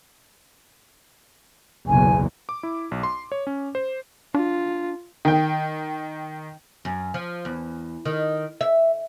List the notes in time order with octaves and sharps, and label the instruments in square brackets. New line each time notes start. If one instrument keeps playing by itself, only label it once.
[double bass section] F#1 B1 E2 [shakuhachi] G#5
[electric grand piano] D6
E4
B1
C6
C#5
C#4
C5
[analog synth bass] D4 [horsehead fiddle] F4
[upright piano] D#3 G5
[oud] F#2
F3
E2
D#3
E5